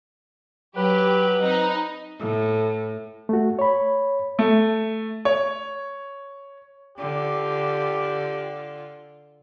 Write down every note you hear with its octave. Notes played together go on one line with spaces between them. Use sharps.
F#3 G4 B4
C4 D#4
A2
A3 F#4
C#5 B5
A3
C#5
D3 F4 G4